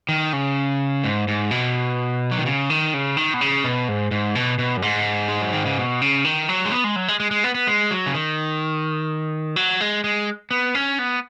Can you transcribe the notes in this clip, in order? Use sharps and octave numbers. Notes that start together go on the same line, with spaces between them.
D#3
C#3
G#2
G#2
B2
F#3
D#3
C#3
D#3
C#3
D#3
B2
C#3
B2
G#2
G#2
B2
B2
F#2
G#2
G#3
F#3
D#3
C#3
B2
C#3
D#3
F#3
G#3
B3
G#3
F#3
G#3
G#3
G#3
B3
B3
G#3
F#3
C#3
D#3
F#3
G#3
G#3
B3
C#4
B3